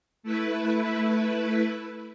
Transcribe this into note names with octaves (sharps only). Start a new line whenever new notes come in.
A3 E4 B4